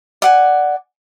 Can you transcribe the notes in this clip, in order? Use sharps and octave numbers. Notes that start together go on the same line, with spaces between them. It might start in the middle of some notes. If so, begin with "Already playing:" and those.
D5 F#5 G#5